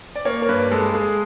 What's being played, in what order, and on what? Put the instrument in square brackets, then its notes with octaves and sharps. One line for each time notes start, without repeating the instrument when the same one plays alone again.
[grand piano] D5
A#3 C#5
A#4
G2 B4
G#3 A4
A4
G#3 G#4